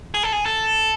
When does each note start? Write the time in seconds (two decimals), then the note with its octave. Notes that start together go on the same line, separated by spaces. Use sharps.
0.14 G#4
0.23 A4
0.33 G#4
0.46 A4